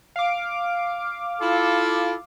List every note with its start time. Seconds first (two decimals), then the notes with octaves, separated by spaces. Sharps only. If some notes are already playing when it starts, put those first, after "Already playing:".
0.16 F5 D6
1.40 E4 F4 A4